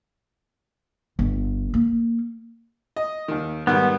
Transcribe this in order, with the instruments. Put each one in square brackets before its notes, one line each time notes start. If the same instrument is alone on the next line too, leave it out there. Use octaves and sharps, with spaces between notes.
[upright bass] G1
A#3
[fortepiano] D#5
D#2 D#3
[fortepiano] G#2 D#3 G3 [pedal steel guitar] B3